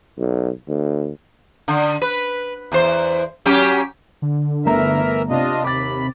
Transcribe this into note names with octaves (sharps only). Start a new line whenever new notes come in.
B1
D2
D3
B4
E2 C5
F#3 C#4 G4
D3
G1 E3 A3 A#4 E5 A#5
C3 D4 F4 D#5
D#2 B5 D6 A6